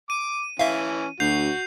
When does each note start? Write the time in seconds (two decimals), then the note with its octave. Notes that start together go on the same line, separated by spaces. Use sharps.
0.10 D6 D#7
0.59 E3 C#4 E5 F5
1.20 D2 F#4 G6 C7 F7